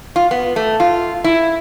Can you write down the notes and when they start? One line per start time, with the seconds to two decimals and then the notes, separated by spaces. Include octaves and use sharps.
0.16 F4
0.31 B3
0.56 A3
0.80 F4
1.24 E4